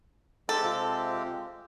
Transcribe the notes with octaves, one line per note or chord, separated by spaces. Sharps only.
G#2 G#3 C4 G4 A4
C3 F4